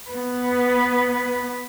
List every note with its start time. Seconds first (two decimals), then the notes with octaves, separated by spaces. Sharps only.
0.10 B3 B4